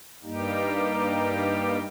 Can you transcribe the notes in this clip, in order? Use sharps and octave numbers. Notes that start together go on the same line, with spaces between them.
G2 G3 A#3 D#4 G4